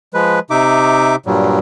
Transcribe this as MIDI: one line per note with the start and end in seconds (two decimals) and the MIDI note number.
0.14 0.39 53
0.14 0.39 56
0.14 0.39 71
0.50 1.16 48
0.50 1.16 63
0.50 1.16 76
0.50 1.16 86
1.26 1.59 43
1.26 1.59 46
1.26 1.59 54
1.26 1.59 55